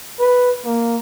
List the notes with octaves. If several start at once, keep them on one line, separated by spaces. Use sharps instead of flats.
B4
A#3